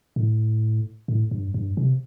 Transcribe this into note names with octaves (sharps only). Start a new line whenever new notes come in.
A2
A2
G2
G2
C3